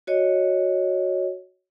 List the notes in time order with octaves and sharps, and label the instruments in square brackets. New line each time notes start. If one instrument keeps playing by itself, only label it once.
[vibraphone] F#4 C#5 D#5